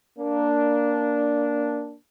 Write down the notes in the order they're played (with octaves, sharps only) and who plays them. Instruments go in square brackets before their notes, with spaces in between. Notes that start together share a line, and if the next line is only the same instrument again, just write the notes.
[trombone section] A#3 D4